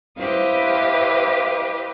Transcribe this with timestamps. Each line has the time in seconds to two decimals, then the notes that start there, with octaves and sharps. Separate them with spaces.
0.18 E4 G4 B4 C5 D#5 F5